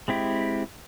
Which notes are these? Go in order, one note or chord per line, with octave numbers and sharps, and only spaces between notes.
G#3 C4 E4 G4